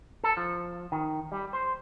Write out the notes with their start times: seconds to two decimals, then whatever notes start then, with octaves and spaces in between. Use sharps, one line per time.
0.24 A4
0.37 F3
0.92 D#3
1.32 G3
1.53 C5